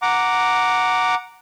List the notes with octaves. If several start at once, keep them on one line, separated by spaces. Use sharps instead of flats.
F#5 A#5 D6